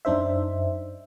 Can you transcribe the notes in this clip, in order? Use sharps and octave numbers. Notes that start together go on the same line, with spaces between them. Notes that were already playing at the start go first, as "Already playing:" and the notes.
F#2 D4 D#4 C5 E5